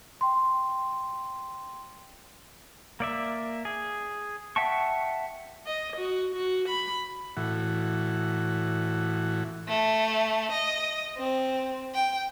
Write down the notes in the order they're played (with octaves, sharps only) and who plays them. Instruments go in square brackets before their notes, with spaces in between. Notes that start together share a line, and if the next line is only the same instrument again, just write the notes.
[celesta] G5 C6
[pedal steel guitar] A#3 D5 E5
G#4
E5 F#5 G5 A5 C#6
[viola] D#5
F#4
F#4
B5
[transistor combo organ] A2 E3 F#4
[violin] A3
D#5
C4
G5